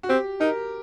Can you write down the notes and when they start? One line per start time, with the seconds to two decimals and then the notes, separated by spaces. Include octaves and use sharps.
0.03 F#4
0.09 C4 G4
0.41 D#4 A#4